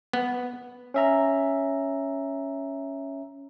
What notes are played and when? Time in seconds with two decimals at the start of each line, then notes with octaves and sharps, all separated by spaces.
0.13 B3
0.94 C#4 E5 A#5